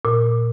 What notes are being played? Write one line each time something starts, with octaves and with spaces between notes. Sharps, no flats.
A#2